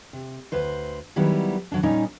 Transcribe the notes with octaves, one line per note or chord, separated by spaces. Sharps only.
C3
D2 B4 C5
D#3 F#3 G3 B3 D#4 E4
D3 F#3 D4
A#2 G3 C#4 D#4